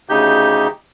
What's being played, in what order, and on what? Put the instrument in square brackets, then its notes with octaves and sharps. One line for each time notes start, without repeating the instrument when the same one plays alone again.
[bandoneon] D2 C#3 D#4 G4 G6